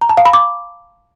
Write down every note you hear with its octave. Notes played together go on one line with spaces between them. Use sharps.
A#5
A5
F5
B5
D6